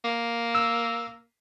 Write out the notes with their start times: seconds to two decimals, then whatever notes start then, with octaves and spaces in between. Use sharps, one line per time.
0.05 A#3
0.55 E6